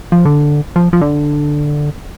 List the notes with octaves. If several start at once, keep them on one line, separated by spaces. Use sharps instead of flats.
F3
D3
F3
F3
D3